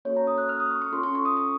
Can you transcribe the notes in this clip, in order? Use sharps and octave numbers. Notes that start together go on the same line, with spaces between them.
A#3 C#4 F#4 A4 C#5
A#5
D#6
F#6
F6
D#6
C#6
C#6
C#4 F4 A4 C6
C#6
C#6
D#6
C#6